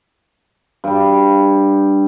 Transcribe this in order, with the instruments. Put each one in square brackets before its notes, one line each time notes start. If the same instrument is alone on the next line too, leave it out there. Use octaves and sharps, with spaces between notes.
[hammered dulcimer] G2 G3